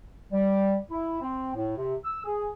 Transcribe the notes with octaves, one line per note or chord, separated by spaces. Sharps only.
G3
E4
C4
A2
C3
E6
G#4